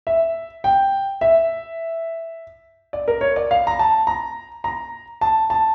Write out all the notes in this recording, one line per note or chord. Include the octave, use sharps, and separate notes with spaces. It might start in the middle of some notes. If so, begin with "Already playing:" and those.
E5
G5
E5
D5
A#4
C#5
D5
F5
A#5
A5
A#5
A#5
A5
A5